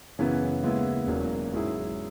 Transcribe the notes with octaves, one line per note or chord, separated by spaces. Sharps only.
F#2 C#3 E3 B3
D#2 C#3 G#3 B3 E4
E1 D#2 C#3 F#3 A#3
G#2 F#3 C#4 E4 G#4